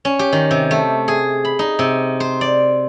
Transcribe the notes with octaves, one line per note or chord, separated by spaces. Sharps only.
C#4
G4
D#3
C3
A3
G#4
B5
D#4
C3
C5
D5